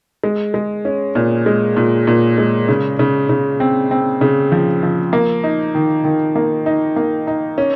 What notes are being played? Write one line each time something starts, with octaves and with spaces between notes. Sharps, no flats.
G#3
G#3
C#4
A#2
G#3
A#2
A#2
G#3
C#3
C#3
C#3
C4
C4
C#3
F3
F3
A#3
D#4
D#3
D#3
A#3
D#4
A#3
D#4
C#4